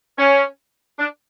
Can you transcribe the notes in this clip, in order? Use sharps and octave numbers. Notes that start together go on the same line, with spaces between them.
C#4
D4